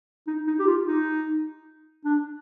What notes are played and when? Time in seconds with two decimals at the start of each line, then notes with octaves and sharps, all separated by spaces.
0.27 D#4
0.47 D#4
0.59 G4
0.67 F4
0.87 D#4
2.05 D4